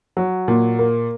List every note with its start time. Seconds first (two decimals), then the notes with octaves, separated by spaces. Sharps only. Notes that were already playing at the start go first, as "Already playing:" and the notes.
0.17 F#3
0.48 A#2
0.79 A#3